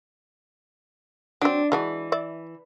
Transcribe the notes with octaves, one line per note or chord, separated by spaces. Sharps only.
F#3 C4 D4
E3 G#3 D4 F#4
D5 E5